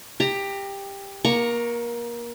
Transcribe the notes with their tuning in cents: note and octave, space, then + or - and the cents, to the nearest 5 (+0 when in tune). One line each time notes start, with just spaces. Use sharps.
G4 +15 A#5 -15
A#3 +25 A#5 +0 C#6 +0